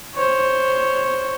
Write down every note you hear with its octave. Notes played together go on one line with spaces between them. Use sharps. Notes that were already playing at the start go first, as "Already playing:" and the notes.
C5 C#5